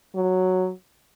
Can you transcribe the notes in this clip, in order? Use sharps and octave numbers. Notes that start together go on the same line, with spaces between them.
F#3